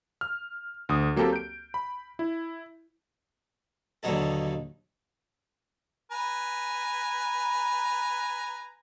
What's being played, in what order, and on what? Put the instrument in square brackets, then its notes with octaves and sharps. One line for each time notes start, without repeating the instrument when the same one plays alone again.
[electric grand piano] F6
D2 D#6
F#3 A#3 C4 G4 A4 A#4
G6 D7
B5
E4
[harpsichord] D#2 B2 D3 F#3 D#4 A4
[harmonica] B4 G#5 A#5